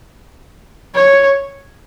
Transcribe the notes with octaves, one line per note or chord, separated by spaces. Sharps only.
C#5